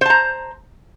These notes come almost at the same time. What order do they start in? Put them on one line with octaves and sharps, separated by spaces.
C5 A5 A#5